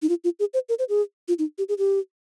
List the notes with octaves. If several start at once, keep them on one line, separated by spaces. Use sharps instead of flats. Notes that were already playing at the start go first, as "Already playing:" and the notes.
D#4
F4
F4
G#4
C5
A#4
C5
G#4
F4
D#4
G4
G#4
G4